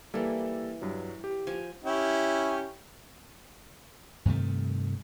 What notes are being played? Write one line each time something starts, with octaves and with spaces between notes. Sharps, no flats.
E3 G3 A#3 E4 A4
G2 F#3
G4
F3 G#5
C#4 E4 G4
G2 C3 D#3 A3